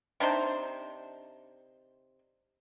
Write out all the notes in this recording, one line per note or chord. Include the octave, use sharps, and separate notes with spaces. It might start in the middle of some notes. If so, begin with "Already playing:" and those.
C3 D4 D#4 C5